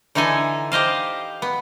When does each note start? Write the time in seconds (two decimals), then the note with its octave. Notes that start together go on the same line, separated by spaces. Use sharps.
0.15 D3 E3 D#4 A4 G#5
0.72 G4 C5 D#5 F5
1.42 B3